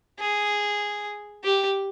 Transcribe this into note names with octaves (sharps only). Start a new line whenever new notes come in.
G#4
G4